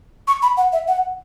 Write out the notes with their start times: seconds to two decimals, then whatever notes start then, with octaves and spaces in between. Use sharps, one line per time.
0.28 C#6
0.42 B5
0.57 F#5
0.73 E5
0.88 F#5